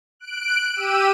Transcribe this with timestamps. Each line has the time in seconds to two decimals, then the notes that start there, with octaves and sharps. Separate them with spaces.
0.20 F#6 D7
0.73 G4 E6 D#7